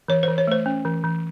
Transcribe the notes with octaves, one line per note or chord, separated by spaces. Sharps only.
E3 C#5
E3 C5
C#5
A3 C5
C#4
E3
E3